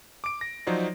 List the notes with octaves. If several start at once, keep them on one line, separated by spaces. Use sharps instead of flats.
D6 D7
A#6
F3 F#3 D#4 C5 D5